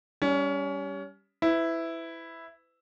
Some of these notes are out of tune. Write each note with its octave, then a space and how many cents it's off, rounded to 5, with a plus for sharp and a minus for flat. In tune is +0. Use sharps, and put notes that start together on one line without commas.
G3 +0 C#4 +25
E4 +0 B4 +40